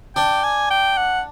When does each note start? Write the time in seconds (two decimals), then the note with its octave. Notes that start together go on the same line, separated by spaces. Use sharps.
0.16 D4 G5
0.43 G#5
0.71 G5
0.97 F#5